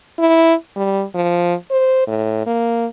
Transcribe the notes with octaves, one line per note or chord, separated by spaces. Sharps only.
E4
G3
F3
C5
A2
A#3